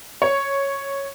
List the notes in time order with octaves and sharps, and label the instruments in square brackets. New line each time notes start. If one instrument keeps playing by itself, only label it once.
[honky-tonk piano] C#5